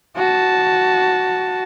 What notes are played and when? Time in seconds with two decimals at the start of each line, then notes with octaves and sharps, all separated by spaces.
0.16 F#4 A5